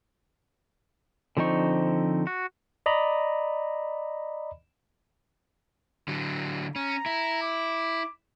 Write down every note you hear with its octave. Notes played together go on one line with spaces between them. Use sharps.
D3 F3 C4 D#4 C#6
F#4
D5 D#5 A#5 B5
D3 F#3
C#4 A#5
E4
D6